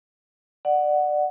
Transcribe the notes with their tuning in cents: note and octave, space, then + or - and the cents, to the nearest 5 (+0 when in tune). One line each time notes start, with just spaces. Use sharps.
D5 +20 F#5 +0